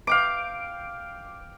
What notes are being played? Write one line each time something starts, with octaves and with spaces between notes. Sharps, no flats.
F5 G5 D6